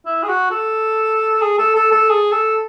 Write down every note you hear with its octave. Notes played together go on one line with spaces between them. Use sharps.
E4
G#4
F#4
A4
G#4
A4
A4
A4
G#4
A4